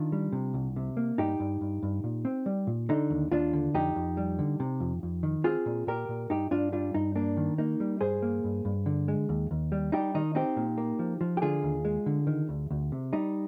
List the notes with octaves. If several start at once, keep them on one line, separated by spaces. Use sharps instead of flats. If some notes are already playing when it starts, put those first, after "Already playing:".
Already playing: D#3 D4 F4
G3
C3
C2
C3
A#3
G2 D#4 G4
G2
G2
G2
A#2
C4
G3
A#2
D3 D#4
D#2
D#2 D4 F4
D3
F2 D#4 G4
F2
G3
D3
C3
F2
F2
D#3
C4 F4 G#4
A#2
A#2 G4 A#4
A#2
G2 D#4 G4
G2 D4 F4
G3 D4 F4
G2 D#4
A#3 D4
D#3
A#3 D#4
G3
G2 G#4 C5
A#3
G2
G2
D3
G#3
D#2
D#2
G3
G3 D#4 G4
D#3 D#4
C4 D#4 G4
A#2
A#3
F3
F3
G4
D3 F4 G#4
D#2
G#3
D3
D#3
D2
D2
C3
G3 D#4